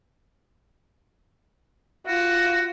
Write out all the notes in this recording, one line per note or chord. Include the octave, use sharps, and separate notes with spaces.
F4 F#4